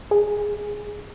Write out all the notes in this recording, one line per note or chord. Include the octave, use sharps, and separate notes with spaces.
G#4